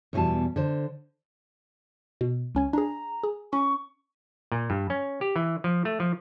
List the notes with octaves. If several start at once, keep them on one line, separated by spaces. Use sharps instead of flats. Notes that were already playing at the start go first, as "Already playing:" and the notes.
E2 B2 E3 G3 A5
D3 C5
B2
C#2 C#4 G#5
D4 G#4 A#5
G#4
C#4 C#6
A#2
G2
C#4
G4
E3
F3
A3
F3